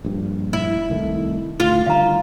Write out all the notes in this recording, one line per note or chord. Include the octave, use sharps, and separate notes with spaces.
A#1 G2
E4
C2 D#3 A3
D2 A2 F4
D3 D#3 G3 F5 A#5